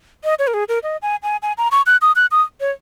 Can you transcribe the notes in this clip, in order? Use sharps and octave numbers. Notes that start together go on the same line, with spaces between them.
D#5
C#5
A#4
G#4
A#4
D#5
G#5
G#5
G#5
A#5
C#6
F#6
D#6
F#6
D#6
C#5